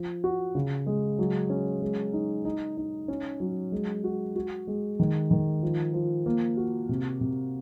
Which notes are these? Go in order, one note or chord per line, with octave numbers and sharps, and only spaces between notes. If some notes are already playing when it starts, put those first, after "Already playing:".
Already playing: F3
F#4
C#3
G#3
F#3
C#4
G#3
D#4
D#4
D#4
C#4
F#3
G#3
F#4
F#4
G#3
D#3
D#3
F3
F3
A#3
F#4
C3
C3